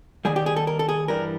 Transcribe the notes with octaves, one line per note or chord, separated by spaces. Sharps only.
D#2 D#3 G3 G#4
G4
G#4
A4
A#4
A4
G#4
G2 E3 G3 A#4